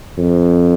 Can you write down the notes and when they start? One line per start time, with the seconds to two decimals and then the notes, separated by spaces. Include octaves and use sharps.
0.18 F2